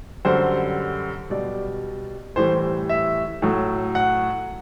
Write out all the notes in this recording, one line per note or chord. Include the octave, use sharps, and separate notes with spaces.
F#2 D3 G3 C5
B2 G3 D5
A2 E3 G3 C5
E5
A2 F#3
F#5